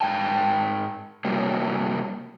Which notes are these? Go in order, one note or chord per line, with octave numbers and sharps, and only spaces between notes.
G#2 G5 A5
C3 F#3 G3 A#3